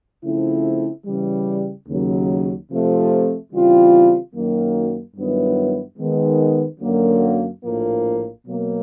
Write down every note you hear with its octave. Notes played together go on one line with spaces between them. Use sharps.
C#3 F3 A3 C4 E4
C#3 E3 G3
D#2 C#3 F#3
C3 F3 A3
C#3 E3 G3 C4 F4
F#2 D#3 F#3 A#3
G2 D#3 F#3 B3 E4
D#3 G#3 B3
F#2 D3 F#3 A#3
A#1 A2 F3 A#3
B2 F#3 A#3